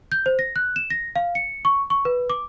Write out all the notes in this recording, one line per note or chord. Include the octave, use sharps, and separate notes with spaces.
G6
C5
A#6
F#6
E7
A#6
F5
C#7
C#6
C#6
B4
D6